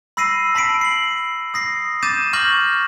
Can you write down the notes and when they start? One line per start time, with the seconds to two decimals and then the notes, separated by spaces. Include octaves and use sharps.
0.17 B5 E6 A#6 C7 D#7
0.55 A5 B5 B6 C7 D7
0.81 C7 F#7
1.54 D#6 A#6 C7
2.03 D6 G6 A6 D#7 E7
2.33 C#6 F6 G6 A#6 F#7